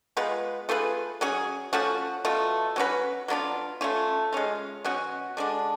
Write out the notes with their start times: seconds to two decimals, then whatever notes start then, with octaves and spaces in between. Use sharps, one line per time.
0.17 G#3 B3 F4 B4
0.69 A3 F4 G#4 B4
1.21 F#3 C#4 G#4
1.73 F3 A3 C#4 F#4
2.25 B2 A3 F4
2.76 F#3 C#4 F#4 B4
3.28 F#3 B3 D4 F4
3.81 A3 C#4 F4
4.33 G#3 C#4 F4
4.84 B2 F#3 C#4 F#4
5.37 D3 G#3 D4